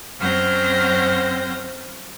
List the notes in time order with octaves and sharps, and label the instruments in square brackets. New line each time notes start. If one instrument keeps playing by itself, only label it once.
[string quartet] F#2 F#3 C4 F6 G6 A#6